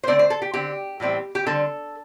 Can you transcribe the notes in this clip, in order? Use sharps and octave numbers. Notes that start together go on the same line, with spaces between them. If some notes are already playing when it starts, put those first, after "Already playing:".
C5
D3 A3 C4 D5
C5
A4
G4
D3 C4 G4
A2 E3 G3 C4
G4
D3 G3 C4 A4